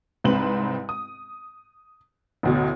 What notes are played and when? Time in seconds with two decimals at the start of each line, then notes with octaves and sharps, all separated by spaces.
0.24 C2 G#2 C4 B4 F#7
0.89 D#6
2.43 A1 D2 B2